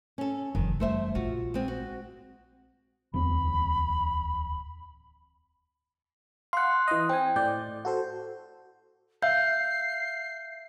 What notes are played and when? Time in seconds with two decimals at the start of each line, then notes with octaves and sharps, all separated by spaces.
0.18 C#4 A4
0.55 F#1 D#3 E3
0.80 E3 G3 A3 C5 E5
1.15 A#1 F4 F#4
1.54 G#3 C4
1.68 F#4
3.14 D1 E2 C4 B5
6.53 F5 F#5 C6 F#6
6.87 E3 D#5
7.09 C4 G5 G#5
7.36 A2 D5 G6
7.85 F#4 A4 C5
9.22 E5 F5 G6 C7